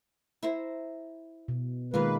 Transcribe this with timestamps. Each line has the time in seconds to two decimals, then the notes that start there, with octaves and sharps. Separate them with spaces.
0.43 E4 C5 A#5
1.48 B2
1.94 D#3 G#3 A#3 F4 B4 F5